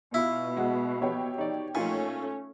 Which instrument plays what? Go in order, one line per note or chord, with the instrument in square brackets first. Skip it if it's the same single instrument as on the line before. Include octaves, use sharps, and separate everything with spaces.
[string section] B2 [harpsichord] E4 [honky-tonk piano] F4 F5
[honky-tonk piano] G#3 F#4
[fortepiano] B3 [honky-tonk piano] G4 C#5
[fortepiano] D#4 D5
[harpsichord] A#2 [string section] A3 C#4 [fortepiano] D#4 F4 G#5